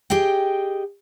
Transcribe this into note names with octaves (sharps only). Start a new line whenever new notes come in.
G4 G#4 D#5 G5